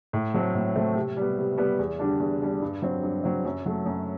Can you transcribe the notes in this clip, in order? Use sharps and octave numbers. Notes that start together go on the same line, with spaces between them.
A2
F#3 A3 C4
A2
F#3 A3 C4
C3
G3 B3
C3
G3 B3
E2
D3 G3 D4
E2
D3 G3 D4
G2
F#3 C4
G2
F#3 C4
F#2
F#3 A3
F#2